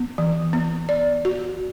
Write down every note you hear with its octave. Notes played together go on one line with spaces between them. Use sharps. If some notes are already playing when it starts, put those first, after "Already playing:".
Already playing: B3
E3
B3
D5
F#4